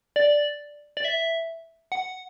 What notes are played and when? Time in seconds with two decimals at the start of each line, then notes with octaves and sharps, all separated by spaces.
0.16 D5
0.97 D5
1.05 E5
1.92 F#5